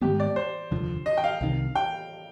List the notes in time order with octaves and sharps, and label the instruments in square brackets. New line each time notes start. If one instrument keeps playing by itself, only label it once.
[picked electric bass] G#2 D#3 G#3 B3 [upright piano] G4
[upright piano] D5
C5
[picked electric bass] F1 D#2 D3 F3
[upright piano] D#5
G5
F5
[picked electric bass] C2 C3 D#3
[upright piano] G5